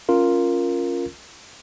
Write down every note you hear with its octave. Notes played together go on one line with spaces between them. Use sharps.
C#4 F4 A#4